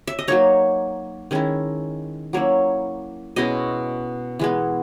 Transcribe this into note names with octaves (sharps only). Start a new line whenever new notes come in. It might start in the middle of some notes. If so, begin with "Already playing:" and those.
E5
D#5
F#3 A#3 D#4 C#5
D#3 G#3 C#4 E4
F#3 A#3 C#4 E4 C#5
B2 G#3 C#4 E4 D#5
E3 G#3 B3